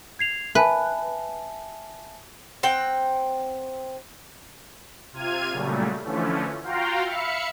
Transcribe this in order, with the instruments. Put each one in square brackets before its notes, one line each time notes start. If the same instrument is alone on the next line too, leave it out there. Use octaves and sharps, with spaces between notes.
[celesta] G#6 C7 F7
[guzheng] B4 [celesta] E5 G#5 A5
[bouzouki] C4 F#5 G5
[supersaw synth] C3 F4 F6 G#6 D#7
A#2 C#3 F#3 G3 A3
D3 E3 F3 A3 C#4
F4 F#4 F5 G5 A#5 C6
E5 F5 B5 C#7